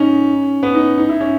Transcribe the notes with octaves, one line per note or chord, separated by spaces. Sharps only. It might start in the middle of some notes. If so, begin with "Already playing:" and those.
Already playing: C#4 D#4
B3
D#4
D#4
E4
C#4